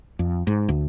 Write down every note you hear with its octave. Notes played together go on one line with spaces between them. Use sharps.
F2
G#2
D2